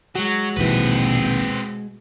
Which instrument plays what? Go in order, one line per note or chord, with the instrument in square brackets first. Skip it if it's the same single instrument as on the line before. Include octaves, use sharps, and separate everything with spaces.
[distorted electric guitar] F#3 [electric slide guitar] G#3 F#4
[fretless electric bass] A#1 D#2 E3 [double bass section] B2 [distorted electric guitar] C4 B4